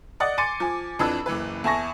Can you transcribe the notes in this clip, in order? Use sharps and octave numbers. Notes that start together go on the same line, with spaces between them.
D5 D#5 F#5 A6
G#5 C6 D6 A6 C#7 D#7
F3 G#5
F2 E3 D4 B4 E6
F#1 E3 B4
E2 E4 G#5 A5 C#6 A#6